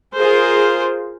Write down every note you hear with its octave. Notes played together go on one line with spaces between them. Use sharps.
F4 G#4 A#4 C5